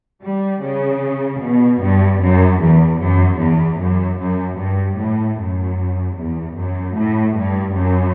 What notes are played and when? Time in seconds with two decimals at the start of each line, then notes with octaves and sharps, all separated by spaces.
0.24 G3
0.64 C#3
1.43 B2
1.83 G2
2.22 F#2
2.62 E2
3.01 F#2
3.41 E2
3.80 F#2
4.20 F#2
4.59 G2
4.99 A2
5.40 F#2
6.19 E2
6.58 F#2
6.98 A2
7.38 G2
7.77 F#2